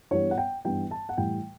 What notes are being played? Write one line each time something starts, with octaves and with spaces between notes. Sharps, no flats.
G2 E3 G3 B3 C#5
F#5
G5
G2 E3 G3 B3 G5
A5
F#5
A2 E3 G3 G5